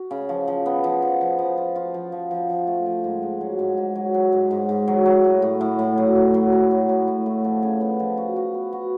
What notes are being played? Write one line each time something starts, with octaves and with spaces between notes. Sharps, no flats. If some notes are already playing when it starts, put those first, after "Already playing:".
Already playing: F#4
C#3
F3
F3
B3
F3
F3
F3
F3
F4
F4
F3
F3
F3
F3
A3
F3
G#2
G#2
F#3
G#2
G#2
F#3
F#3
G#2
G#2
G#2
F#3
F#3
A2
A2
A2
A2
F#3
A2
F#3
A2
F#3
A2
A2
A2
F3
C#3
B3
F3
F#4
F#4
B3
F#4